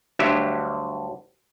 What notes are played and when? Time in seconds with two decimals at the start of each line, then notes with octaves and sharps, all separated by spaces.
0.19 D2 G2 F#3 G4 E5